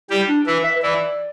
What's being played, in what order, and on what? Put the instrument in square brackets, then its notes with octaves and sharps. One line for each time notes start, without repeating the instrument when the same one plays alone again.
[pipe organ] G3 G4 [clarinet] E4
[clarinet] D4
[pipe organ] E3 E4 [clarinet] B4
[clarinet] E5
B4
[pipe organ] E3 E4 [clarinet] D5